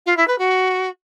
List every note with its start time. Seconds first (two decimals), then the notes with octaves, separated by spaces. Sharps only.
0.06 F4
0.17 E4
0.28 B4
0.38 F#4